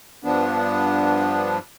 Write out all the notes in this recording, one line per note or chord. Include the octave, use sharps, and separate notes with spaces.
G2 F3 B3 D4